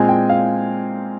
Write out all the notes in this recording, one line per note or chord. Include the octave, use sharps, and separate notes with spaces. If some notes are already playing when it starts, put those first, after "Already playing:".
Already playing: A#2 G#3 C4 G#5
G5
F5